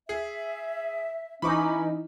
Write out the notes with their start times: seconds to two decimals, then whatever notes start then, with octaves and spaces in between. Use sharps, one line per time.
0.09 G#4 E5
1.42 E3 C#4 D#4 B5 C#6 D6